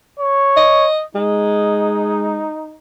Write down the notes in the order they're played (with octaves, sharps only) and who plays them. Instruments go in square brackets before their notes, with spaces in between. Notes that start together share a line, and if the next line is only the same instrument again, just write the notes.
[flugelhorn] C#5
[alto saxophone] D#5
[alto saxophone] G#3 [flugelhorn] D#4